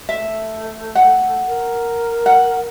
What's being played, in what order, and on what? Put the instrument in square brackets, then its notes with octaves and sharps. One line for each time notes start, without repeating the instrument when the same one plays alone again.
[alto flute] A3 [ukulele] E5
[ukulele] F#5
[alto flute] A#4
[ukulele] F#5